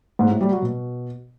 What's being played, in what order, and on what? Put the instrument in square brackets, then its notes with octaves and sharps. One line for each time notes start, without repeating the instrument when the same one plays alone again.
[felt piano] G#2
A2
G3
F#3
B2